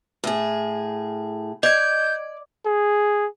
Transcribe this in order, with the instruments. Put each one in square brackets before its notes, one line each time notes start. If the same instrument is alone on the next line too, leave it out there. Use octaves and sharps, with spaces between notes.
[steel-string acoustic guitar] A2 G#4
[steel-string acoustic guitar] D5 [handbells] D#5 G#6 [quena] G6
[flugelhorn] G#4